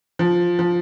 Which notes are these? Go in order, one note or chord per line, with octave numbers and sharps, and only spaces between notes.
F3
F3